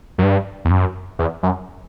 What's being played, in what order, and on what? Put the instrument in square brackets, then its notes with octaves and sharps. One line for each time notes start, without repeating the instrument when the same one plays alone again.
[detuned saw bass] F#2
G2
E2
F#2
E2
F#2